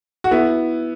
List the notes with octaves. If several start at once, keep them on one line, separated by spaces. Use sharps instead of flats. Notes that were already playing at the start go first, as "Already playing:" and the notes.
F#4
B3 E4